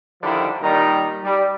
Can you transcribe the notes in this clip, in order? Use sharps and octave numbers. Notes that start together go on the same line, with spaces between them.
D3 D#3 F3 G3 E4
A#2 D#3 G3 D#4
G3